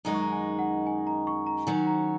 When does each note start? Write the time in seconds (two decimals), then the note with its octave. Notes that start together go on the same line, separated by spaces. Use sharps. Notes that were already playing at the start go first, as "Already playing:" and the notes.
0.05 F#2 D#3 G#3 D#4 F#4 A#5
0.14 C#6
0.22 A#5
0.32 G#5
0.59 F#5
0.87 G#5
1.07 A#5
1.27 C#6
1.46 A#5
1.67 D#3 F#3 C#4 F#4 G#5
1.87 A#5